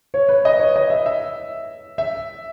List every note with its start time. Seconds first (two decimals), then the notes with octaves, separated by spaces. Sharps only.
0.14 C#5
0.29 B4
0.45 D#5
0.60 C#5
0.76 D#5
0.90 E5
1.06 E5
1.98 E5